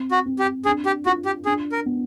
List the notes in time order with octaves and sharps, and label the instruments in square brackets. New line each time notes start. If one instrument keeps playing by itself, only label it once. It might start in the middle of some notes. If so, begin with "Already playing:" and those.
Already playing: [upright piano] C4
[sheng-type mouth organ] F#4
[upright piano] C4
[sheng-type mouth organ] G4
[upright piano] D4 [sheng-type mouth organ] G#4
[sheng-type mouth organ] G4
[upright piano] F4 [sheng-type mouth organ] F#4
[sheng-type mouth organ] G4
[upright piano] D4 [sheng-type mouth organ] G#4
[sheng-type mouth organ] A#4
[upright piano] B3